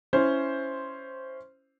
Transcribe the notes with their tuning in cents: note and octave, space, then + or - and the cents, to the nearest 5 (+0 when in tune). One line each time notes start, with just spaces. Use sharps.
C#4 +0 E4 +0 C5 +0